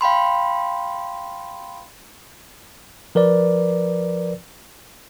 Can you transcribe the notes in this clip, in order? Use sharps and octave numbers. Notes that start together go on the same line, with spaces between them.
F5 G5 B5 C6
F3 A#4 B4 D5